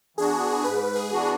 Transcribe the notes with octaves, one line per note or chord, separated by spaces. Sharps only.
E3 B3 D4 F#4 G#4
G#2 B4
G#4
E3 B3 D4 F#4